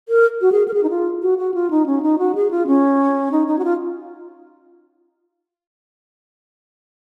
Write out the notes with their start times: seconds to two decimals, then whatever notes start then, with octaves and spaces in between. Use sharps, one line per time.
0.09 A#4
0.41 F#4
0.52 G#4
0.68 A#4
0.74 G#4
0.83 D#4
0.90 F4
1.22 F#4
1.38 F#4
1.54 F4
1.71 D#4
1.86 C#4
2.02 D#4
2.19 F#4
2.35 G#4
2.51 F4
2.67 C#4
3.32 D#4
3.47 D#4
3.59 F#4
3.64 F4